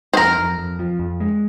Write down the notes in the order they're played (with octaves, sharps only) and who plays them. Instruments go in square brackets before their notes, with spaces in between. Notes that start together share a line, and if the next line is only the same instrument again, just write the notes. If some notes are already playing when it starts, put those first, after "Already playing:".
[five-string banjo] C5
[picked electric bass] F2 [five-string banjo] A#4
[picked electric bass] F2
F2
F3
F2
G#3